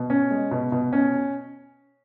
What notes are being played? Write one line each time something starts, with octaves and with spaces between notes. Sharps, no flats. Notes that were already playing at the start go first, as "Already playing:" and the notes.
Already playing: B2
C#4
G#3
B2
B2
C#4